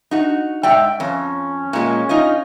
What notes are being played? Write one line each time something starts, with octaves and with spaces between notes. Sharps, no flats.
D#4 F#4
G#2 D5 E5 G5
F2 C#4
A#2 G#3
D#4 F4 D#5